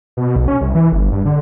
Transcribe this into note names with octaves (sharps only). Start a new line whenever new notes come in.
B2
B1
C#4
C2
E3
G1
G2
D3